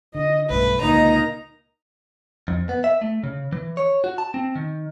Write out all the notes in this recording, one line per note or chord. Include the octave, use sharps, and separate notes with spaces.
D3 D#5
B1 G2 A3 B4
C#2 A#2 D3 A#3 D#4 D#5 A#5
F2
B3
E5
A3
C#3
E3
C#5
F#4
A5
C4
D#3